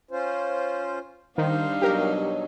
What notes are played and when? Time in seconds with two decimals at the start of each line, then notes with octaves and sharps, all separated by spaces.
0.11 C#4 F4 C5
1.38 D#3 G3 D4 D#4 C5 F5
1.82 B2 F#3 G4 A#4